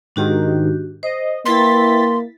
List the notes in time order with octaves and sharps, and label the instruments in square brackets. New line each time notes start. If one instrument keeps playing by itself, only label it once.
[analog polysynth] G#2 D#3 [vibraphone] D4 F#4 G4
[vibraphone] C5 [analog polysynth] D#5
[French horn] A#3 [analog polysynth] E4 A6 B6 [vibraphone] B4 G5 [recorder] C6